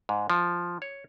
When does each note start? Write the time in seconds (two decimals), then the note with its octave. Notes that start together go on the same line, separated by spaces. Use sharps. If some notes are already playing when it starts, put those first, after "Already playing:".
0.09 G#2
0.30 F3
0.82 C#5